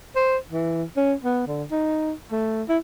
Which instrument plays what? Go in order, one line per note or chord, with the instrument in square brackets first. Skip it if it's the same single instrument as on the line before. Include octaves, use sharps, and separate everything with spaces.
[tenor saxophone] C5
E3
C#4
B3
D3
D#4
A3
E4